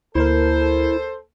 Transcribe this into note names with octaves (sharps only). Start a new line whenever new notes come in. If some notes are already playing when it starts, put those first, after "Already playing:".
D2 A#3 E4 A4 A#4 C5